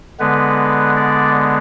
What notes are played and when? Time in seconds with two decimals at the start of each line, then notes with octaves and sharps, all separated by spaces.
0.20 D3 G#3 B3 B4
0.96 D5